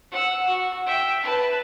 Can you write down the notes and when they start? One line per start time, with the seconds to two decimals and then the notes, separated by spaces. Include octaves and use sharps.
0.11 F#5 E6
0.47 F#4
0.86 E5 G5
1.22 B4 A5